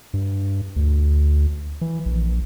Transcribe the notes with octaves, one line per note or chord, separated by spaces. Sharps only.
G2
D2
E3
A#1